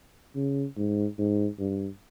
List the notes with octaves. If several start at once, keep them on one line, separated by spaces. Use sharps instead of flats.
C#3
G#2
G#2
G2